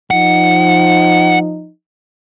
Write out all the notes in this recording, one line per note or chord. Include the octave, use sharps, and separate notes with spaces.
F3 D#4 F#5